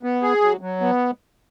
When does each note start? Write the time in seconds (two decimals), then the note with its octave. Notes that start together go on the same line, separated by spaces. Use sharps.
0.03 B3
0.23 G#4
0.42 F#3
0.61 F#3
0.81 B3